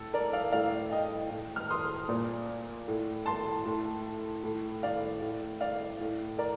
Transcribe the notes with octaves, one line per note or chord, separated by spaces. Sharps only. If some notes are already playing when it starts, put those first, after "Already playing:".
Already playing: A2 A4
A#4 D5
D5 F5
A#4
A2 D5 F5
D#5 G5
A2
F6
C6 D#6
A#2
A2
A5 C6
A2
A2
D5 F5
A2
D5 F5
A2
A#4 D5